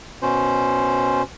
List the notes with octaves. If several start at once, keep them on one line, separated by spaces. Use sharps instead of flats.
B2 C#4 C5